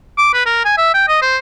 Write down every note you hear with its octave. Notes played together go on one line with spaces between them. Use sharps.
D6
B4
A#4
G#5
E5
G5
D#5
C5